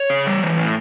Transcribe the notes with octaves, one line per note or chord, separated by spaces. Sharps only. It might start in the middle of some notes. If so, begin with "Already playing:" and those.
Already playing: C#5
C#3
G3
E3
A2